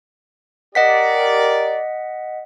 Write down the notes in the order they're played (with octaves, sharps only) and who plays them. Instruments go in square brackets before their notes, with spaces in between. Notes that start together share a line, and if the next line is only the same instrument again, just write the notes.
[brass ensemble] G4 A#4 D5 [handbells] D#5 F#5 B6